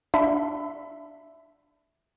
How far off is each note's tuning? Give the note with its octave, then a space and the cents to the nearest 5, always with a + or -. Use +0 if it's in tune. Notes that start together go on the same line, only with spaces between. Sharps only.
D4 +0 E5 +0 B5 +35